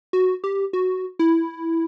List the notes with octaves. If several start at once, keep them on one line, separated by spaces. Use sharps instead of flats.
F#4
G4
F#4
E4